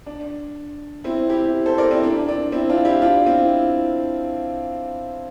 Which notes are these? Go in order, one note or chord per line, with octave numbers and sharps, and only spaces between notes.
D4
C4 E4
E4 G4
A4 C5
A#4 D5
C4 E4
D4
D4
C4 E4
D4 F4
E4 G4
D4 F4
C4 E4